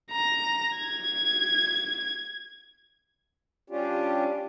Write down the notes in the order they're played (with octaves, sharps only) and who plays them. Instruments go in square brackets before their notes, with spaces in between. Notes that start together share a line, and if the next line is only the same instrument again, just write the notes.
[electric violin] A#5
G#6
[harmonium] G3 C#4 D4 F4 G4